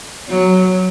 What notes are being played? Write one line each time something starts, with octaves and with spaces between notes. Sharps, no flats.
F#3